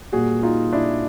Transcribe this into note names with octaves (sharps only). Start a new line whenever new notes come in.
A#2 G3 A#3 F#4 G#4
D#4 F4
D4 E4